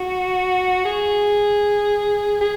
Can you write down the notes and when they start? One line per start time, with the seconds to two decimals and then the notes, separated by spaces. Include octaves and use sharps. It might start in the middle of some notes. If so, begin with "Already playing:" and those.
Already playing: F#4
0.85 G#4
2.41 G#4